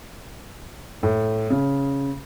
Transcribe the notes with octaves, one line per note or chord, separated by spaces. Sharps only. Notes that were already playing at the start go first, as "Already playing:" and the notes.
A2
C#3